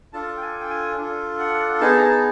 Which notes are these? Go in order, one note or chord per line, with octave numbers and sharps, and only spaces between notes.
D4 F4 A4 A5
G5
G#5
G5
G#5
D4 F4 A4
F#5
B3 D#4 G#4 A5
A#5
A5